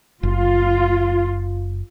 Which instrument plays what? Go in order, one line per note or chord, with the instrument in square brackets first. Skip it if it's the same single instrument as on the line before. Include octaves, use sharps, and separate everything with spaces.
[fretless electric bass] F#1 [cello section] F4